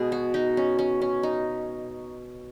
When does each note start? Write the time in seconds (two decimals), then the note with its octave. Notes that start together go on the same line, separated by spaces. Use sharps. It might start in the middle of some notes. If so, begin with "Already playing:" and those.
Already playing: B2 G#3 B3 G#4
0.12 F#4
0.34 D#4
0.57 C#4
0.79 C#4
1.02 C#4
1.23 D#4